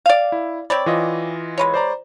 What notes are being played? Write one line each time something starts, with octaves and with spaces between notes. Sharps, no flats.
D5 F5
E4
C4 C#5 D5 B5
E3 F4 D#5
G#3 B4 C#5
C5 D5 A#5